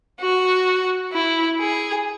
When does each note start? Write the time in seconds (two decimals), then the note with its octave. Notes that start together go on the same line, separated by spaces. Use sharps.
0.21 F#4
1.13 E4
1.60 G#4